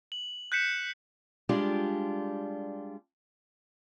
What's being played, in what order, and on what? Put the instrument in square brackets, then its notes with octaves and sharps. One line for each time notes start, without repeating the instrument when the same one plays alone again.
[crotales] F#7
F#6 G6 B6 C#7 E7
[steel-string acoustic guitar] G3 G#3 D4 F4 G4